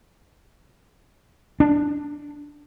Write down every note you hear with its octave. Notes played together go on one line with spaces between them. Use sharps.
D4